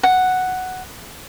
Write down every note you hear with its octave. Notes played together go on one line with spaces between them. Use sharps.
F#5